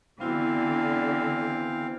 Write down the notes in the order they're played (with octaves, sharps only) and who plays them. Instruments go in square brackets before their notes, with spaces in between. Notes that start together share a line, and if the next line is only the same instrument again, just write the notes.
[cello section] D3 [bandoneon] E3 C4 F5 [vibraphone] B3 E4 F#4